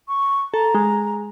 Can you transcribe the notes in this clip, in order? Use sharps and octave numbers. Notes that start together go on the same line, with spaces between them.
C#6
A4 A#5
G#3